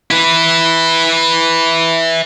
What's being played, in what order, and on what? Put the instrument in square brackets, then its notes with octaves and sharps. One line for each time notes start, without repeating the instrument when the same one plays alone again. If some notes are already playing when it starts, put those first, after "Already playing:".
[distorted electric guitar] E4 B4